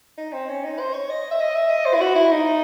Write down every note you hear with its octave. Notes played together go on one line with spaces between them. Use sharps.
D#4
C4
C#4
D#4
C5
C#5
D#5
E5
D#5
E5
D#5
C5
E4
F#4
E4
D#4